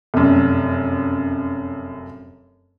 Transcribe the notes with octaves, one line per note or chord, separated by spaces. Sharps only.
F1 F#2